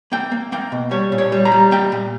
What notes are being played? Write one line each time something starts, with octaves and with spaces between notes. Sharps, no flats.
A#3 G5
A#3
A#3 G5
B2
G3 C#5
A#2
C#5
G3
A#5
G3
A#3 G5
A#2